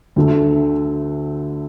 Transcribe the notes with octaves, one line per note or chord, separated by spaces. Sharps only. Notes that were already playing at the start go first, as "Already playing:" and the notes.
D2 D3 A3